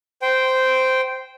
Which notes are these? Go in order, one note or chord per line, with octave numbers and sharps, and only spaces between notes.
C5 G5